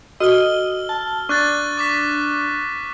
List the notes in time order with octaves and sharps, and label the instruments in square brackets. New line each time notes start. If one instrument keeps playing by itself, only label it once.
[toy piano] F#4 A4 [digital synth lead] D#5 [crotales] E6 F6 G7
[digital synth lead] A5
[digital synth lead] D4 [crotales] C#6 F#6 A6
[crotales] C#6 D6 B6